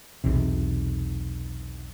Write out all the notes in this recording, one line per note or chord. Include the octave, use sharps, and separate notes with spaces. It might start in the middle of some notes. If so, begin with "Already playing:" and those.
B1 E2 C3